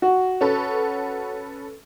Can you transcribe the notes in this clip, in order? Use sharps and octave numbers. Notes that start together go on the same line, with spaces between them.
F#4
C#4 A4 B4